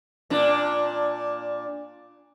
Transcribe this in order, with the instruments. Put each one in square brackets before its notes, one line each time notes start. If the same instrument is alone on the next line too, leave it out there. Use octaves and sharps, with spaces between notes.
[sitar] A#2 D4